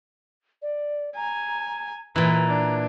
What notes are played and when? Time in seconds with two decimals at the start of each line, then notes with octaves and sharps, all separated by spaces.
0.62 D5
1.16 G#5 A#5
2.16 A#2 E3 B4 A#5
2.48 D4